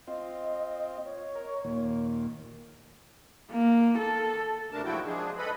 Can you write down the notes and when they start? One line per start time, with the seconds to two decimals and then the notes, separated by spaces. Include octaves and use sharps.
0.07 C4 F4 D#5
1.05 C#5
1.35 A#4
1.64 D#2 A#2
3.52 A#3
3.98 A4
4.71 D2 C3 A3 D4 A#4 A5
4.85 G#2 F3 F#3 E4 F#4 G5
5.05 F3 G#3 D4 G#4
5.38 A4 B4 D#5 B5